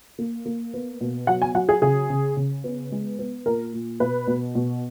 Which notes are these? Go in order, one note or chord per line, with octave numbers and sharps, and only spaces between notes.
A#3
A#3
B3
B2
F#3 F#5
G#5
F#3 F#5
G#4
C#3 G#4
C#3
C#3
B3
G#3
B3
A#2 A#4
A#2
B2 B4
B2
B2